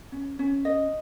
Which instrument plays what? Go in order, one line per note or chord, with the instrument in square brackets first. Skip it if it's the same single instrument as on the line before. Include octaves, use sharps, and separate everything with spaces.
[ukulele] C#4
C#4
D#5